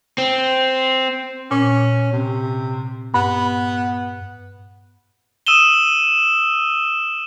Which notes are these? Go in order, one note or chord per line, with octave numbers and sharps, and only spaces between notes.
C4
A#2 C#4
C3
G2 B3
D#6 E6 D#7 E7 G7